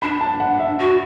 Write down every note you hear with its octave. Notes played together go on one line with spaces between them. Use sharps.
D4 B5
A5
F#5
E5
F#4